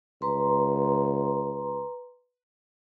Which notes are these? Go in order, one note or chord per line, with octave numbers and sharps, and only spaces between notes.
C#2 B4 A#5 C6